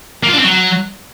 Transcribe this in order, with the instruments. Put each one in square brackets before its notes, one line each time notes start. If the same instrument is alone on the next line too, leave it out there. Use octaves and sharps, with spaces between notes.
[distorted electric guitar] A#3
F4
D4
C4
F#3